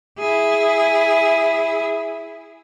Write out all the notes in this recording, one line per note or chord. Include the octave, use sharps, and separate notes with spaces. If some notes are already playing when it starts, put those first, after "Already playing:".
E4 G#4